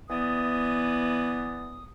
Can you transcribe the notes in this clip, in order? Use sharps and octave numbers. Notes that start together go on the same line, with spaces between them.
E3 B3 D5 D#6